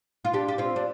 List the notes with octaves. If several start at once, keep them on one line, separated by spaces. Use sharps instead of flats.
F4
D4 G4
G4
C4 F4
D4